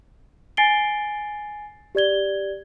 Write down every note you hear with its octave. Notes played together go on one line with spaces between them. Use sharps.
G#5 A6 C7 D7 G7
G4 D5 G#6 G7